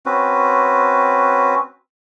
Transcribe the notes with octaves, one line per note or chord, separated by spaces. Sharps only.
C4 C#4 F#4 B4